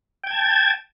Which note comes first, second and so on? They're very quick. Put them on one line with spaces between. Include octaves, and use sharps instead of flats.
G5 G#6 A5